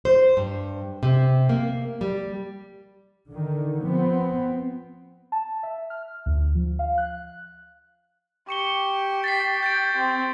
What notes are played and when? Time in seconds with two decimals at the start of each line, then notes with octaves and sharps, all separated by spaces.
0.05 C5
0.37 G2
1.03 C3
1.49 A#3
2.01 G3
3.28 D3 D#3
3.82 F3 B3 C4
5.32 A5
5.63 E5
5.90 F6
6.26 D2
6.55 F3
6.79 F5
6.98 F#6
8.49 G4 C#6 C#7 G7
9.24 A6 B6 C7
9.63 G6 A6 D7
9.96 C4